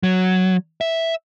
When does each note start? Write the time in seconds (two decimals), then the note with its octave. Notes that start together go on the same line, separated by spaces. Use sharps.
0.03 F#3
0.81 E5